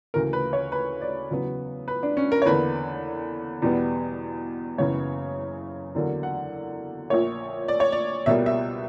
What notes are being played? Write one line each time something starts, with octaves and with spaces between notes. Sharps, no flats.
D2 C#3 E3 A#3 A#4
B4
C#5
B4
D5
E2 C#3 F#3 B3
B4
D4
C#4
A#4
C#5
E2 D3 A#3 B4
E2 B2 G3 B3
F#1 F#2 C#3 E3 B3 C#5
E2 D3 F#3 A#3
F#5
A#1 A#2 A#3 C#5
D5
C#5
D5
C#2 B2 G3 A#3 E5
E5